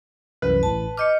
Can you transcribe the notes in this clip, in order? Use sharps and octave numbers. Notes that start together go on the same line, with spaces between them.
C2 F#2 E3 B4
A1 A2 A5
D#5 D6 F6 G6 C#7